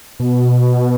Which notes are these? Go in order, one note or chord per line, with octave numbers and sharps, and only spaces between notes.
B2